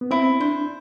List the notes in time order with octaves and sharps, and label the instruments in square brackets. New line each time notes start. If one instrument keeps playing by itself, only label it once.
[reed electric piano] B3
[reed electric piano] C4 [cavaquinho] E4
[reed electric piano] D4 [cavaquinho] C5